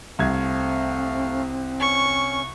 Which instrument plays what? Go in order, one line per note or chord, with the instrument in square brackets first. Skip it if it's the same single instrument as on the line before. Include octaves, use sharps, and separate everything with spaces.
[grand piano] C2 G#6 [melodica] A3 F5 [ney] C4
[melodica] C#4 [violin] C#6